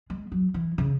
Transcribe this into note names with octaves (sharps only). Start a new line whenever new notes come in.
G#3
F#3
E3
C#3